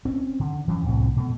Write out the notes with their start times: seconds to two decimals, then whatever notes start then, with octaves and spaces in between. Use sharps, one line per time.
0.05 C4 C#4
0.40 D3
0.68 F2 E3 F#3 C#4
0.86 C2 A2 C4
1.16 B2 A3